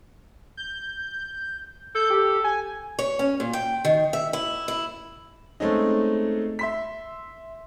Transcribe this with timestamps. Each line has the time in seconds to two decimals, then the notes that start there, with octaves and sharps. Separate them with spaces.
0.57 G6
1.95 A4 G6
2.10 G4
2.44 G#5
2.99 C#5
3.19 C#4
3.40 A#2
3.53 G5
3.85 D#3
4.13 E5
4.33 E4
4.68 E4
5.60 G#3 A3 C4 C#4 D#4
6.59 E5 C6 B6